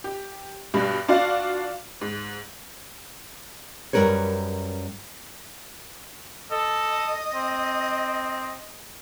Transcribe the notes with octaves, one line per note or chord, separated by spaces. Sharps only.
G4
G2 B2 G3
D4 F4 F#4 D5 F5
G#2
F#2 C3 G3 A#4 B4 C#5
A4 D#5
C4